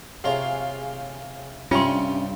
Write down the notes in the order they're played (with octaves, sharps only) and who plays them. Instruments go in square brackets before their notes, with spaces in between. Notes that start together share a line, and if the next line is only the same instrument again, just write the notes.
[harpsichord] C3 F4 A#5 [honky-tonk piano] G#4 C#5 F5
[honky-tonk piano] G2 C#7 [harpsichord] C3 G3 A#5 [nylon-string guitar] C#4 [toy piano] F4 C6